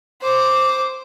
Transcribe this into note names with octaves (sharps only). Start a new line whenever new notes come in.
C5 D6